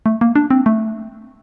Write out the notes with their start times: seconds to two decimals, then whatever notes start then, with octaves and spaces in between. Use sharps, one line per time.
0.06 A3
0.21 A#3
0.36 D4
0.51 C4
0.66 A3